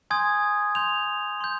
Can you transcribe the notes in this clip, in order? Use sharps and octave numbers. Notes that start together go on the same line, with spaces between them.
G#5 C6 D#6 G6 G#6
C6 G6 F7
C6 G6